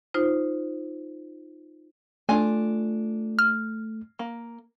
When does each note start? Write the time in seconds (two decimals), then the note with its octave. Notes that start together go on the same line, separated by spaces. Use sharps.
0.14 D#4 F4 C5
2.29 A3 D4 F4 G#5
3.39 F6
4.19 A#3